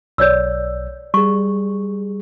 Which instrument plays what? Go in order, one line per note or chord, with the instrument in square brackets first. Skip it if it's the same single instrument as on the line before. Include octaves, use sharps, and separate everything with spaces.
[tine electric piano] B1 [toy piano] C#5 D5 E6
[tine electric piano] G3 G#4 [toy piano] C#6